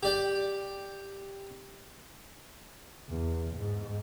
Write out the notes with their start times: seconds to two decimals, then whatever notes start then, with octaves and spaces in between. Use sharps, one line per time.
0.03 G4 D5 G5
3.09 E2
3.55 G#2